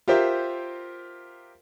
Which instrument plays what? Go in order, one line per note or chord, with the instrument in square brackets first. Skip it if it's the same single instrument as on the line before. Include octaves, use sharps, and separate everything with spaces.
[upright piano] F4 G4 A#4 C5 E5